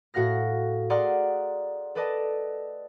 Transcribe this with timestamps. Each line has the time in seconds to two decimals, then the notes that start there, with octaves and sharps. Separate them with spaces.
0.14 A2 F#4 F5 F6 A#6
0.90 G#4 D5 F#5 A#5 C6 F6
1.95 A4 B4 D5 D#5 A5